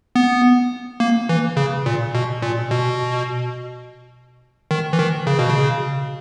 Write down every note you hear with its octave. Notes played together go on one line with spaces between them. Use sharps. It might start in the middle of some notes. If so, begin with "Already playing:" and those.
B3
A#3
E3
C#3
A#2
B2
A#2
B2
D#3
E3
D#3
C#3
B2
C#3